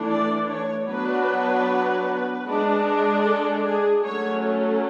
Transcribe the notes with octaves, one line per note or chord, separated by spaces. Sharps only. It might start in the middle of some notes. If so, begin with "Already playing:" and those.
Already playing: E3 A3 D4
D5
C#5
F#3 B3 D4 B4
G#3 D4
A4
G#4
F#3 A3 C#4 C#5
A4